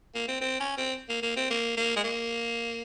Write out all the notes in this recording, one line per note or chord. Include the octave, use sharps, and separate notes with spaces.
A#3
C4
C4
C#4
C4
A#3
A#3
C4
A#3
A#3
G#3
A#3